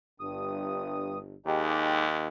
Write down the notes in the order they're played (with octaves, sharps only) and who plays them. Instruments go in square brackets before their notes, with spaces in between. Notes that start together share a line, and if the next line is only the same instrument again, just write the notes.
[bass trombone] G1 [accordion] G2 D#6
[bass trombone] D#2 [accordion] G#3 D#4 G4